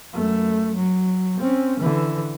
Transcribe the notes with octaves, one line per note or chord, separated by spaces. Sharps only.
F#2 A3
F#3
C4 C#4
D3 E3